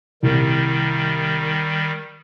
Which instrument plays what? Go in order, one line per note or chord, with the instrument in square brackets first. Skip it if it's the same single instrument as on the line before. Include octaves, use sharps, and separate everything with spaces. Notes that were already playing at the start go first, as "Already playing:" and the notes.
[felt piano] C2 [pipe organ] D#3 G3